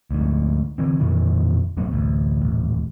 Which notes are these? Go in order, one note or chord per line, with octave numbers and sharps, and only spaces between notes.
D2 G#2
D3 E3 C4
F2 A#2 D#3 E3
E1 A1 F#3 B3
A1 D2
D#1 A1